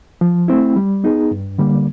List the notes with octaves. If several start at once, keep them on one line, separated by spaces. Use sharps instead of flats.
F3
A3 C4 E4
G3
B3 D#4 G#4
G2
D3 G3 A#3